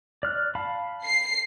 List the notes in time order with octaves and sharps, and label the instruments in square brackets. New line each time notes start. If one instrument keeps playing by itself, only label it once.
[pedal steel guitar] D5 F6 F#6
F5 A5 B5
[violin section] C7